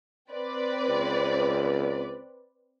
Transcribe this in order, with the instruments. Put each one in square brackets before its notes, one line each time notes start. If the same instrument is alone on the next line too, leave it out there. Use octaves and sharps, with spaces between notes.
[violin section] C4 B4 D5
[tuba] C#2